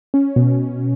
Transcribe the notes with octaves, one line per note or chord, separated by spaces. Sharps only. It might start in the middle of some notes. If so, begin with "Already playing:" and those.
C#4
B2